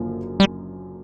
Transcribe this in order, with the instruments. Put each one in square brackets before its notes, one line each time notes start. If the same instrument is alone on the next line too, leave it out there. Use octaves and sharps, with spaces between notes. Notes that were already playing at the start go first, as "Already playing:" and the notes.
Already playing: [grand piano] F#1 F#2 D3 F3 A#3
[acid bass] G3